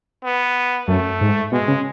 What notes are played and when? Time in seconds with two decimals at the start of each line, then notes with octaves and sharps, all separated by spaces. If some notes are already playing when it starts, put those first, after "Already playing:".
0.24 B3
0.88 F#2 A3
1.21 G#2
1.52 B2 G#3
1.68 C#3